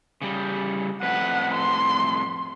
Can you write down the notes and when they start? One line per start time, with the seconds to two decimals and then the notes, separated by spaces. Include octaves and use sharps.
0.22 C#3 G3
1.03 F2 A2 B4 F#5
1.54 C6